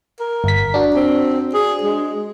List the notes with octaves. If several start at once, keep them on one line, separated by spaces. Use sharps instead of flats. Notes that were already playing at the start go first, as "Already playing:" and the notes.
A#4
G1 B6
D4 F#4
C4
G#4
G#3